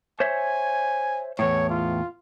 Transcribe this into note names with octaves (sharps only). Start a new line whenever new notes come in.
C5 C#5 E5 G#5
E2 A2 C#5
F4